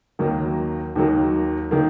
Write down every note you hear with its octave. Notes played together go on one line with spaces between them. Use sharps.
D#2 D#3 F#3 A#3
D#2 D#3 F#3 A#3
D#3 F#3 A#3